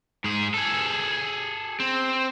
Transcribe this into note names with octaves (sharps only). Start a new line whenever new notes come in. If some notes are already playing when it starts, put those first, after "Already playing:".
G#2 G#4
G#4 A4
C4